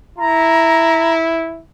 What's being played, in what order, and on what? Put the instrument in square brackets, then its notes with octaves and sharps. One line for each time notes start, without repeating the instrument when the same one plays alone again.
[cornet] E4 [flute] A#5